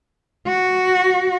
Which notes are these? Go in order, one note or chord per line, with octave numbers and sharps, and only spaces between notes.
F#4